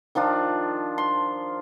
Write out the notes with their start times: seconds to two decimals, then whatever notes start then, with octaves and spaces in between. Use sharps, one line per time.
0.15 D#3 F3 D4 F4
0.98 C6